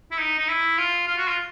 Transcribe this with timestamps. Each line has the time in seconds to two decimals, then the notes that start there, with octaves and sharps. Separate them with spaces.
0.11 E4
0.18 D#4
0.38 D#4
0.48 E4
0.78 F4
1.07 F4
1.17 F#4
1.28 F4